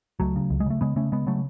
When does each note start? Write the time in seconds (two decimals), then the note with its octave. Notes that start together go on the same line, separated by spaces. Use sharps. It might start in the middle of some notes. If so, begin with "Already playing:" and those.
0.20 C#2 F#3 A3
0.36 C#3
0.50 C#2
0.60 G#3
0.66 C#3 A3
0.81 C#3 G#3 B3
0.96 C#3 A3 C#4
1.12 C#3 G#3 B3
1.26 C#3 F#3 A3